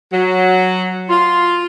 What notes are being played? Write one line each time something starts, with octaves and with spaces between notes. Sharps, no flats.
F#3
F4